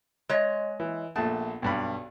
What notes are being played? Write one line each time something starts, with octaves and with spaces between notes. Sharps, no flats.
G#3 C#5 D#5
E3
A#1 A3 B3 A5
B1 G2 B5